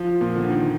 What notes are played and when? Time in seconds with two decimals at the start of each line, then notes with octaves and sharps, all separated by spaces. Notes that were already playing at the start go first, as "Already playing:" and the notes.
Already playing: F3
0.21 A#2
0.35 D3
0.50 D#3